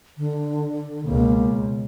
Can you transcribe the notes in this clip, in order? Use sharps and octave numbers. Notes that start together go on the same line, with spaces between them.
D3
C#2 B2 A#3